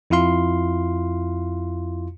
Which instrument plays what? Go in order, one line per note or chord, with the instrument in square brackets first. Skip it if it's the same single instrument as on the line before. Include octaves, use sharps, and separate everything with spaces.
[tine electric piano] F2 E4 F4 F5 C6